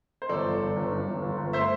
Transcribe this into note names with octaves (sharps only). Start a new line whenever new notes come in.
C5
G1 A4 D5
G1
G1
G1
G2
G1
G1
G1
A3 C5 E5